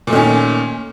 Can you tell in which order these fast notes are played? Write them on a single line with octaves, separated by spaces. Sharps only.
A#2 A3 D#3 C#4